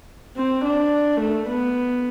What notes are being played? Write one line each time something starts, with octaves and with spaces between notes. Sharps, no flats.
C4
D4
A3
B3